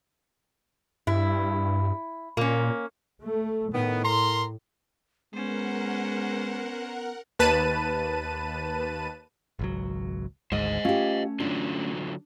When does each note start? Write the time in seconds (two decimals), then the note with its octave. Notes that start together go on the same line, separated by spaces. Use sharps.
1.07 G2 E4
2.37 A#2 A#3 C#4
3.22 A3
3.73 A2 D#3 B3
4.03 A#4 A#5 C6
5.34 G#3 B3 C#4 A#4 C5 F#5
7.39 D#2 B4 A5 D#7
9.59 G#1 C#2 F#3
10.52 G#1 D2 G#2 G#3 C5 D#5
10.85 A3 C#4 F4 G4
11.40 D3 F#3 D4 F4